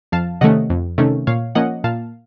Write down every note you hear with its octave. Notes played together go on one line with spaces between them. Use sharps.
F2 F5 A5
C3 D#3 A3 C#4 D#5 F#5
F2
C3 D#3 A3 C#4
A#2 C#5 F5
F3 A#3 C#4 D#5 F#5
A#2 F5 A5